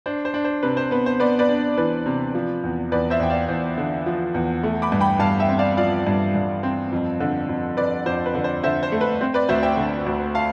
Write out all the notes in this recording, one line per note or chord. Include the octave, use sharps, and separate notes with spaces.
D4 C5
C5
D4
C5
C3 B4
C5
B3 B4
C5
B3 B4 D5
B4 D5
D4
E3 B4 D5
C3
F3
E2
E2 B4 D5
C5 E5
E2 G5
D5 F5
E2 C5
D3
F3
E2
A3
B5 D6
G2
G5 B5
G2 F5 A5
E5 G5
C4
D5 F5
F3 D5 F5
G2
G2
C4
F2
D3
F2
F2 B4 D5
F2 C5
B4
D3
C5
D3 C5 E5
C5
A3
B4
C4 C5
B4 D5
D2 C5 E5
E5 G5
D3
D2
F5 A5